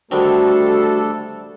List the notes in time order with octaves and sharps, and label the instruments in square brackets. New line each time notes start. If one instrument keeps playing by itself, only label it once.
[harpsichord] D3 D#3 C4 [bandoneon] G3 D4 [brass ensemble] A3 A4 [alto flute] F#4